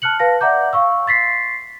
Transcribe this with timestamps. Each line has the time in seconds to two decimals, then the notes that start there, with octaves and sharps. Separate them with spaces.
0.02 A5 F6 F#6 C#7 F#7
0.19 B4 F5 A5 A#6
0.41 D5 E5 F#5 A#5 D6 G6
0.73 F5 C#6 E6
1.06 C6 A6 B6 C7